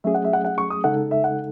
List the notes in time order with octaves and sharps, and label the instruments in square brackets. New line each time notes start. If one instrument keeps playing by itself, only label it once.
[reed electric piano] F#3 A3 C#4 G#4 [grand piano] E5
[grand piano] F#5
E5
F#5
F#5
C#6
D#6
[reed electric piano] C#3 G#3 D#4 A4 [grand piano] F#5
[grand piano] E5
F#5